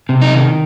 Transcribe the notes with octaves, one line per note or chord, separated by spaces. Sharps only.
C3
D#4
D#3